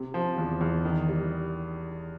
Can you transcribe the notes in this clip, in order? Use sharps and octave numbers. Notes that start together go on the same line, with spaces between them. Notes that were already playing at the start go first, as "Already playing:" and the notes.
Already playing: C3
F3
E2
E2
D#3
G3